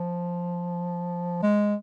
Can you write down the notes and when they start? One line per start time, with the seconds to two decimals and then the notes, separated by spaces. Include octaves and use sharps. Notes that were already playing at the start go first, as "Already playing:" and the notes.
Already playing: F3
1.43 G#3